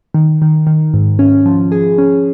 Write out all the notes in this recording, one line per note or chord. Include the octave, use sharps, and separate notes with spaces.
D#3
D#3
D#3
G#2
C#4
F3
G#4
C#4